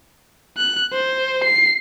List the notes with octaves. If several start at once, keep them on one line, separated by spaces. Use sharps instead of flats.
F#6
C5
C7